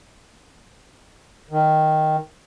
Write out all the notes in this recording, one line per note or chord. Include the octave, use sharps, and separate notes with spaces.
D#3